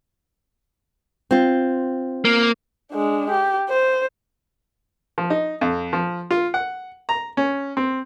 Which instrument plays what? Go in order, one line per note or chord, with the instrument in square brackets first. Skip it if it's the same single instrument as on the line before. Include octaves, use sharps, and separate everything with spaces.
[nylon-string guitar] C4 F4
[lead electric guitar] A#3
[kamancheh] G#3 D4
G4
C5
[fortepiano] F3
D#4
F2
F3
F4
F#5
A#5
C#4
C4